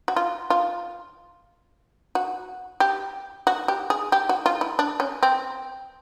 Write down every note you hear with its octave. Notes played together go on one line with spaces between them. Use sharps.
F#4
F4
F4
F#4
G4
F#4
G4
G#4
G4
F#4
F4
E4
D4
C#4
C4